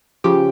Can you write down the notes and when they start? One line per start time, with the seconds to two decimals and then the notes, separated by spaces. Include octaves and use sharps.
0.24 C#3 F3 G4